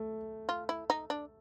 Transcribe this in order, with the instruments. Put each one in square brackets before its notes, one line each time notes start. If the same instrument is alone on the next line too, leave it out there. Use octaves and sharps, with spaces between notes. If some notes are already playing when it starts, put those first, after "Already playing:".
Already playing: [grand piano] A3
[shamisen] F4
E4
D#4
D4